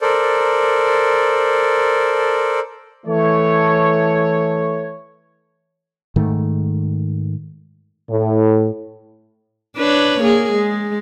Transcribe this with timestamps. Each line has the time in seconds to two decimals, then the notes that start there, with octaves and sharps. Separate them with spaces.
0.01 A4 A#4 C5 D5
3.06 E3 A3 C#5
6.16 G#2 D#3 A3
8.10 A2
9.77 D4 B4 C#5
10.20 A#3 G#4
10.52 G#3